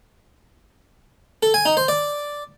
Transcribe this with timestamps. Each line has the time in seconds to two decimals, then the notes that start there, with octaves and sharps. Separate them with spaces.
1.43 A4
1.54 G#5
1.66 D#4
1.77 C5
1.88 D5